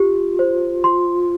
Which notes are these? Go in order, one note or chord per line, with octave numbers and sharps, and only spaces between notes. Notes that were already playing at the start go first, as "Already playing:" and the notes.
Already playing: F4 G4
C5
C6